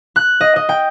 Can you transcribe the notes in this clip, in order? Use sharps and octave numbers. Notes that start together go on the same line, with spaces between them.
F#6
D#5
D#5
G5